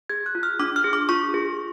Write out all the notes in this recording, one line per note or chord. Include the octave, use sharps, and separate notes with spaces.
G#4 G#6
F#6
F4
F6
D4 D6
F6
G#4
D6
F4 C#6
G#4